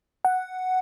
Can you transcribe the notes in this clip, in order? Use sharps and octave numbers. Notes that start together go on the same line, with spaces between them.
F#5